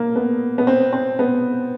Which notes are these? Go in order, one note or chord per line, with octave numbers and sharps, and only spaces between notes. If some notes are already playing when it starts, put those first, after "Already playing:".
Already playing: A#3
B3
B3
C4
C4
B3